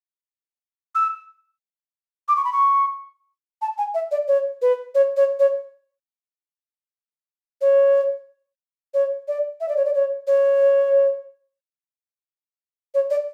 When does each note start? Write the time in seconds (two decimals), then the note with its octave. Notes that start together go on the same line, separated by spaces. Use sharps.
0.95 E6
2.28 D6
2.36 C#6
2.45 B5
2.53 C#6
3.62 A5
3.78 G#5
3.94 E5
4.11 D5
4.28 C#5
4.62 B4
4.95 C#5
5.17 C#5
5.39 C#5
7.61 C#5
8.94 C#5
9.28 D5
9.60 E5
9.68 D5
9.77 C#5
9.85 D5
9.95 C#5
10.27 C#5
12.94 C#5
13.10 D5